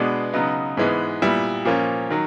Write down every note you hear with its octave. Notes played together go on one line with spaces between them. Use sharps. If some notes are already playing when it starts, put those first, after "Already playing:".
Already playing: B2 G#3 B3 D4
C#3 F#3 B3 D#4
G#2 E3 G#3 B3
A#2 G3 B3 E4
A#2 F3 A#3 C#4
D#3 F#3